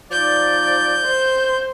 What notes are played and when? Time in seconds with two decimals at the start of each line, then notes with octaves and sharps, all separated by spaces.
0.11 F3 D#4 D5 G6
1.06 C5